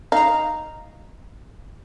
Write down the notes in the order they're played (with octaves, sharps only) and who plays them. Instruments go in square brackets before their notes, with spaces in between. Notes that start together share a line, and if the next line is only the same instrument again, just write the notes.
[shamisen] D#4 [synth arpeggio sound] F5 A#5